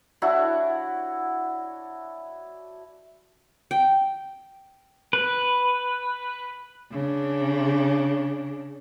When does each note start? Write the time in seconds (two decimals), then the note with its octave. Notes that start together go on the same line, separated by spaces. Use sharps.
0.22 D4 E4 F#4 C#5
3.71 G5
5.13 B4
6.92 C#3 D4